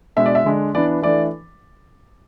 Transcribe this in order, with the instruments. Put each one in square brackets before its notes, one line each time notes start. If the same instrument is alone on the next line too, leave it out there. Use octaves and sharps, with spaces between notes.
[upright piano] B2 G#3 D4 E5
D5
E5
D3 G#3 D4
E3 B3 D4 D5
E3 A3 D4 D5